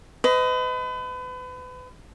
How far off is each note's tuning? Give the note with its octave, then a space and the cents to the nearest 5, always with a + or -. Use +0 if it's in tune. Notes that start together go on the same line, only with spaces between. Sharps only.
B4 +35 D#5 +15